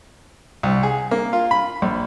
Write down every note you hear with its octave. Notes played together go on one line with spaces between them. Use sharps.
C2
G#4
A#3
F4
B5
A#1